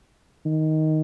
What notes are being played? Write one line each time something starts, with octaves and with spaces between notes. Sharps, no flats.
D#3